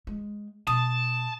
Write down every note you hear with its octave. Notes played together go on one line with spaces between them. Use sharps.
G#3
B2 A5 D#6